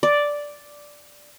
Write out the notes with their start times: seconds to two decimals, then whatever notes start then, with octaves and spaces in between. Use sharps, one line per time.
0.03 D5